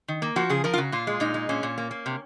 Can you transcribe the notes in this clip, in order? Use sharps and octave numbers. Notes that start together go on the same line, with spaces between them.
D#3
A#3
F3 F#4
C#3 G#4
F3 A#4
F4
C#3 F#4
A#2 F4
G#3
A#2 D#4
G#3
A#2 C#4
A#2
A#3
A#3
C3